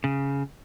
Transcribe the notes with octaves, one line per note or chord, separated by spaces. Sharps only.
C#3